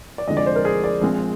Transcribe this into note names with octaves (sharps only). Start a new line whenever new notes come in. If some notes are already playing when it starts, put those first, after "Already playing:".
D5
F1 F2 D3 G#3 D#5
D5
C5
A#4
G#4
D5
A#1 A#2 G#3 C4